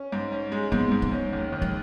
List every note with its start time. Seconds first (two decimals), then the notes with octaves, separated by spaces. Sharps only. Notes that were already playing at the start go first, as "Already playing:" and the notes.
Already playing: C#4
0.12 G#2
0.32 C#4
0.52 G#3
0.72 G#2 B3
0.92 G#2
1.02 G#3
1.12 C#4
1.33 D#2
1.52 D#2
1.62 G#3